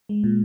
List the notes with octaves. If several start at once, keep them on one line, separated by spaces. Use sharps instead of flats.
G#3
A#2